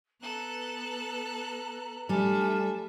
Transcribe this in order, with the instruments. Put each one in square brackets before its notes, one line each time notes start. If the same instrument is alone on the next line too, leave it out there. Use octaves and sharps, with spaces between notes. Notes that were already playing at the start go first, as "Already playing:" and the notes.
[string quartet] B3 A4 F#6 [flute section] B4 A#5
[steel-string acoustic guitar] G3 A4 [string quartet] A3 E5 [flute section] D4 G#5 F6